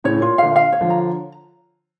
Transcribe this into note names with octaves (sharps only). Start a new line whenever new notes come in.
A2 C#3 C#5
A#2 F4
A#2 D3 F5
F5
C#5
D3 F3
A#5